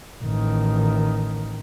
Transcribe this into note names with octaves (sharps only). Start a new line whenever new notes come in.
A1 D#3